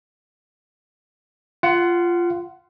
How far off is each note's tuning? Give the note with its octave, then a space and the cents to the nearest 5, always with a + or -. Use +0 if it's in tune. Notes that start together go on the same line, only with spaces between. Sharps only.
F4 -10 F#5 +15